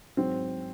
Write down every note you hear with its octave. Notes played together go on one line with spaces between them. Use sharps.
G#2 F#3 C4